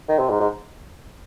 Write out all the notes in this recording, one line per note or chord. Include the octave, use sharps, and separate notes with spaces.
D#3
C3
G#2
G#2